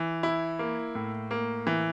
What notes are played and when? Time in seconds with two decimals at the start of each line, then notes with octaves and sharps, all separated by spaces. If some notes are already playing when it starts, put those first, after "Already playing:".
Already playing: E3
0.23 E4
0.59 A#3
0.95 A2
1.31 A#3
1.67 E3